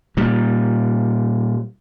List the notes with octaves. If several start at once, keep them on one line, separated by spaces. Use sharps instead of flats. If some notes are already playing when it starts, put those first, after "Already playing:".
A#2 G3